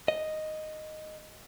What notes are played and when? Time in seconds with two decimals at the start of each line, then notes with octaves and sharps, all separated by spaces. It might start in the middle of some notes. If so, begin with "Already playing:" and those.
0.08 D#5